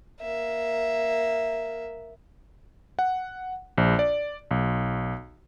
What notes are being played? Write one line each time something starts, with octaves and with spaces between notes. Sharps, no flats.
A#3 E5
F#5
A#1
D5
B1